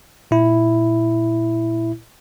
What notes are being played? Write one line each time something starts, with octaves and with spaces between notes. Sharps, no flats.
A#2 E4